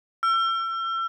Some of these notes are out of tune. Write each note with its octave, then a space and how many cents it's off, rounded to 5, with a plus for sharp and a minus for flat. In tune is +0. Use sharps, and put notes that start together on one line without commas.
E6 +35